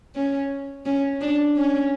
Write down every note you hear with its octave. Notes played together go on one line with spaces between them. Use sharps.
C#4
C#4
D4
C#4